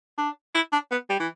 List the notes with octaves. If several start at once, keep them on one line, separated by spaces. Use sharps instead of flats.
D4
E4
D4
B3
G3
E3